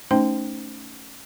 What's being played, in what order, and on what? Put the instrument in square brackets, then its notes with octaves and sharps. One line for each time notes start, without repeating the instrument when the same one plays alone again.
[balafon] A3 C#4 D#4 C5 G5 C6